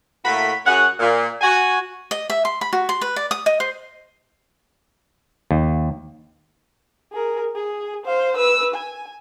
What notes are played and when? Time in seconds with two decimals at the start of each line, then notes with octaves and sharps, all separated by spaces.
0.25 A2 A3 A#3 F#4 B5
0.66 F#2 F#4 G#4 C#5 F#5
1.00 A#2
1.41 F#4 G#5
2.11 D#5
2.30 E5
2.45 C6
2.61 B5
2.73 F#4
2.89 C6
3.01 B4
3.16 D5
3.31 D#6
3.46 D#5
3.60 C5
5.51 D#2
7.12 G#4 A#4
7.55 G#4
8.05 C5 F5
8.37 B4 E6
8.74 G#5